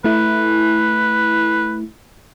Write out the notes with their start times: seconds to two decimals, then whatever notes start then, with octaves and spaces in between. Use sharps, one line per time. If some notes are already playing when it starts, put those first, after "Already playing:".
0.04 A3 E4 B4